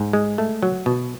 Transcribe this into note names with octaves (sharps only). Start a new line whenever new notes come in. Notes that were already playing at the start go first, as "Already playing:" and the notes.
Already playing: G#2
G#3
A3
F#3
B2